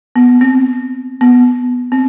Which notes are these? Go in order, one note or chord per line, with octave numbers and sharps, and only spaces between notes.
B3
C4
B3
C4